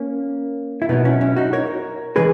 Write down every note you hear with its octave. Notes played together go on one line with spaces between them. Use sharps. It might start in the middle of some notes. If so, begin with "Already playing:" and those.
Already playing: A#3 C#4
E4
B2 F#3 B3 D#4
C#4 E4
C#4 E4
D#4 F#4
A#4 C#5
C#3 E3 G#3 G#4 B4